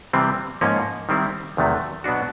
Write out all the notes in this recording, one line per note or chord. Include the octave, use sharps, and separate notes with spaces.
C3 E3 G3 C4
G#2 F3 A#3 C#4
D#3 G3 C4 E4
E2 C3 D#3 F#3 A3
B2 F#3 B3 D4 F#4